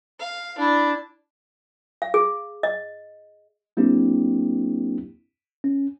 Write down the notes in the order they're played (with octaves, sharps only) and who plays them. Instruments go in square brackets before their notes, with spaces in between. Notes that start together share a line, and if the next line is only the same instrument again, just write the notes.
[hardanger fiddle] F5
[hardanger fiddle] D4 [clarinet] E4
[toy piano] F5
G#4
D#5
[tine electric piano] F#3 A#3 C4 D4 E4 G4
C#4